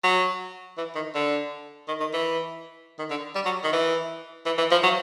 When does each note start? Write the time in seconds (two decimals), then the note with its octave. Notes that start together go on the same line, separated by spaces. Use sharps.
0.04 F#3
0.77 E3
0.95 D#3
1.15 D3
1.88 D#3
2.00 D#3
2.13 E3
2.99 D#3
3.10 D3
3.35 G3
3.45 F#3
3.64 D#3
3.73 E3
4.46 E3
4.58 E3
4.71 F3
4.83 F#3